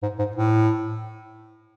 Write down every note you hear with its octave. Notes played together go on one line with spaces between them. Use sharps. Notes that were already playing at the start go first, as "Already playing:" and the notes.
G#2
G#2
A2